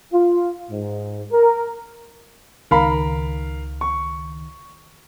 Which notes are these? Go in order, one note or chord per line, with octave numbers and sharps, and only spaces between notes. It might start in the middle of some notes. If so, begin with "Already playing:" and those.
F4
G#2
A#4
C#2 D#3 A#4 F5 B5
C#6